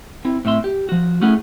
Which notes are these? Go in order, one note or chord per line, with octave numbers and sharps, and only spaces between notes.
C4 E4
A2 C4 E5 C6
G4
F3 F#4
A3 C#4 E4 G#4 F#5